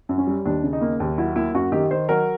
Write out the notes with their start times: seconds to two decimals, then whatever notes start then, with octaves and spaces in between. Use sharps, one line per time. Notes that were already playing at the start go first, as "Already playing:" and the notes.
0.09 F#2
0.18 C#4
0.27 G3
0.45 D#2 D4
0.64 C#3
0.73 D#4
0.81 A#3
1.00 D#2
1.18 F#3 E4
1.36 A#3 E4
1.54 F#2 F#4
1.72 D#3 G4
1.91 D#3 C5
2.09 F#3 A#4